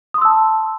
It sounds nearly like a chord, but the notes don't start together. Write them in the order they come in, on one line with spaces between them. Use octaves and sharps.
D#6 C6 E6 A5